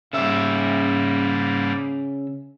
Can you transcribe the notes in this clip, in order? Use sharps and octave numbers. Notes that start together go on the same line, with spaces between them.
G#2 C#3 G3 A#3 E5